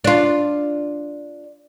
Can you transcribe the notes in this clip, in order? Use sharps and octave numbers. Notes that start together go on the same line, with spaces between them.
D4 F4